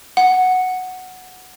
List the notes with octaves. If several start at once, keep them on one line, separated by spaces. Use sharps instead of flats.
F#5